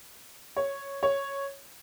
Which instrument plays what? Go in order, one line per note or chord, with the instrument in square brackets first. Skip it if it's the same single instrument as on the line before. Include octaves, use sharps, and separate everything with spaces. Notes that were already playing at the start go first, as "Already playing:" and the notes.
[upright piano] C#5
C#5